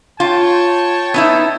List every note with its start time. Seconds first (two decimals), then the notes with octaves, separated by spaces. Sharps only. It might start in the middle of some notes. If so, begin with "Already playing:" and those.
0.20 F4 C#5 G5 A5
1.14 B3 D#4 E4